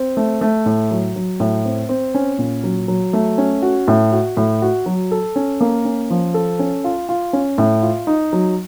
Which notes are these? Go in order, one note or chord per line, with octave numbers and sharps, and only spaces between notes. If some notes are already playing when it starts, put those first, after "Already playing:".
Already playing: C4
A3
A3
A2
F#3
F#3
A2
C4
C4
C#4
A#2
F#3
F#3
A3
C#4
F#4
A2
F#4
A2
F#4
F#3
A4
C#4
A#3
C#4
F3
A4
C#4
F4
F4
C#4
A2
F4
D#4
F#3